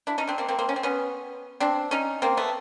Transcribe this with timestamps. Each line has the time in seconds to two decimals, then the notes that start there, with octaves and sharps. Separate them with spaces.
0.07 D4 E4
0.18 C#4 D#4
0.27 C4 D4
0.38 A#3 C4
0.48 A#3 C4
0.59 A#3 C4
0.69 C#4
0.76 C4
0.83 B3 C#4
1.60 C4 D4
1.91 C#4 D#4
2.22 A#3 C4
2.37 A3 B3